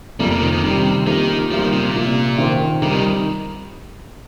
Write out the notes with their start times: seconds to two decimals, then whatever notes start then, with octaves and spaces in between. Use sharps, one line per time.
0.19 F2 F3 G3 A#3
0.31 C3
0.41 D#3
0.53 D#3
0.63 C3 D#3 G3 C4
1.06 D#3 F3 A#3 G4 A#4
1.50 F3 G3 A#3 F4 A#4
1.61 D#3
1.72 C3
1.83 A#2
1.95 C3 F3 A#3 F4
2.38 D#3 C4 F4 A#4
2.82 C3 G3 D#4 A#4
2.93 D#3